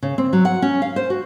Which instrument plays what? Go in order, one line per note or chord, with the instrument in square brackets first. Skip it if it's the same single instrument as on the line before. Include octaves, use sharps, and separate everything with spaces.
[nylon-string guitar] C#3
C4
F#3
F#5
C#4
F5
C5
F#4